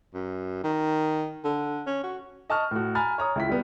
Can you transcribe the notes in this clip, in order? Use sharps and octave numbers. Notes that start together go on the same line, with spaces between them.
F#2
D#3
D3
C#4
F#4
D#5 A5 C#6 F6
A2 F#4
G#5 A#5 B5 F6 A6
C#5 A#5 D#6
C#2 E4 B6
G3 B3